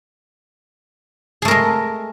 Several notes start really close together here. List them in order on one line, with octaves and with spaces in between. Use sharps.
G#4 A3 A#4 G#3